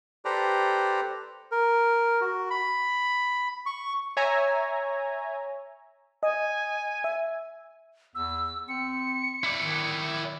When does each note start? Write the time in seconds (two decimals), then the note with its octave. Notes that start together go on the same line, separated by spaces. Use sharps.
0.25 G4 A4 B4 C5 D5 A#5
1.52 A#4
2.21 F#4
2.50 B5
3.66 C#6
4.17 C#5 E5 G#5 A#5
6.23 D#5 G#5
7.04 E5
8.15 E2 E6
8.69 C4 C#7
9.44 E4 D5
9.63 D#3